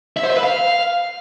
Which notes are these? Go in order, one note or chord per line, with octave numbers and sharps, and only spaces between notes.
E5
C5
E5
B4
F5